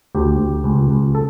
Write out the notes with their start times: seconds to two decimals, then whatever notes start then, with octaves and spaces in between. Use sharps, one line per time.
0.15 D2 G4
0.39 D2
0.64 C#2
0.89 C#2
1.15 A4